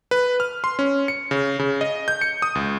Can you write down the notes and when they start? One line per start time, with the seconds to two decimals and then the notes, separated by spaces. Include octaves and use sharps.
0.11 B4
0.40 F6
0.64 C6
0.79 C#4
1.08 C#7
1.31 C#3
1.59 C#3
1.81 D#5
2.08 G6
2.21 C#7
2.42 D#6
2.55 C#2